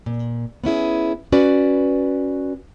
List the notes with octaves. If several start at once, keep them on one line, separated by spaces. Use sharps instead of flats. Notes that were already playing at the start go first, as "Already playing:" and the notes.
A#2
B3 C#4 E4 G#4
C#4 F#4 B4 D5